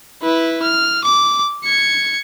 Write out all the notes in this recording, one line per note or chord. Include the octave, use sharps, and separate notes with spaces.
E4 B4
F6
D6
G#6 C#7